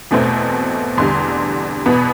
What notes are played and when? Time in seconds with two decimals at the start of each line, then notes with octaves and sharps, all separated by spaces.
0.11 E2 B2 A3 C4
0.98 E2 D3 G3 C6
1.86 E2 B2 B3 B5